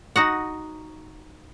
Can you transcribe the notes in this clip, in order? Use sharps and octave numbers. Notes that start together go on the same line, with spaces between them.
D#4 F#4 F#5